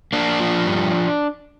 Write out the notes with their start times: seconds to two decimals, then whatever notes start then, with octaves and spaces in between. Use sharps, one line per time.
0.13 A#3 D4
0.40 F3
0.67 G2